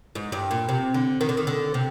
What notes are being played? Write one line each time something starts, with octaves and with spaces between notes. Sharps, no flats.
G#2
G2
A#2
C3
D3
D#3
D3
D#3
D3
C3